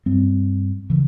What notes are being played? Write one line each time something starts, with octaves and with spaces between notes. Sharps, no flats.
G2 G3 C4
C#3 E3